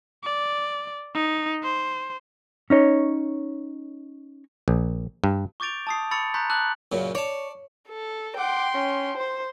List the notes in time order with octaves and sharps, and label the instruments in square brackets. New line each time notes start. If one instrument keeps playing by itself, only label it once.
[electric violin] D5
D#4
C5
[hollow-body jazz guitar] C#4 D#4 C#5
[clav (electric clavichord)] A#1
G2
[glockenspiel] C#6 D6 G6 A6 D7 F7
A5 D#6 C7
B5 C#6 E6 A6 C#7 F7
A#5 C6 C#6 F#6 G6 B6
A5 D6 E6 F#6 F#7
[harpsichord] F#2 A#2 C#3
[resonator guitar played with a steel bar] C#5 [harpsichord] D5 A5
[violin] A4
[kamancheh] F#5 D6 [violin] G5 C6
[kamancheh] C#4
C5 C6